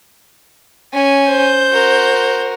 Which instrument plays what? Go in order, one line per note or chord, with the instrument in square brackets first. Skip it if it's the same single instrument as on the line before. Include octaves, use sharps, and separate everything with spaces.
[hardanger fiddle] C#4 G#5
[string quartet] C5 G6
[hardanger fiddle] F#4 A#4